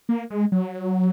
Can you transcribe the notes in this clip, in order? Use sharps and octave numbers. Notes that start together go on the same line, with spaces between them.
A#3
G#3
F#3